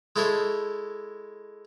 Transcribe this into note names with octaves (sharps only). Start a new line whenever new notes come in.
G#3 E4 A4 C5 C#5